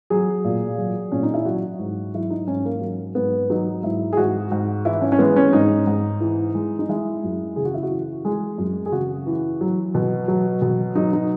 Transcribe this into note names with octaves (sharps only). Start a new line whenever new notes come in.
F#3 G#4
A#2
F#3
A#2 C#4
D#4
E4
F#3 F#4
G#2
F#3 E4
D#4
G#2 C#4
A#3
F#3
G#2 B3
F#3 D#4
G#2 E4
G#4
G#2 F#4
G#2
E3 E4
C#4
C#4
G#3 B3
C#4
G#2 D#4
G#2
E3
G#3
D#4
G#3 E4
F#2
C#3 G#4
F#4
E4
F#4
E3
G#3 G#4
F#2
G#4
C#3 F#4
E3
F#3
B2
F#3
B2
F#3 D#4
D#4